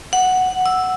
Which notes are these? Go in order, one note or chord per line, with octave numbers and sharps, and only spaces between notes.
F#5
E6